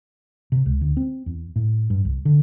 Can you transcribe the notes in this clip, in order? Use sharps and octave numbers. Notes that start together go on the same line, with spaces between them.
C3
C#2
D2
C4
E2
A2
G2
C2
D3